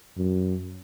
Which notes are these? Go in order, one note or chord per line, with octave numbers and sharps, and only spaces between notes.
F#2